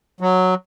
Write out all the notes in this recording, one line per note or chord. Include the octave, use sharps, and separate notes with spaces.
F#3